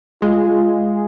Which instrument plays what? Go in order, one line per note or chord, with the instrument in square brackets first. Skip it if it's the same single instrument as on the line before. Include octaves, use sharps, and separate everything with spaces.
[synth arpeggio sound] G#3 [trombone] F4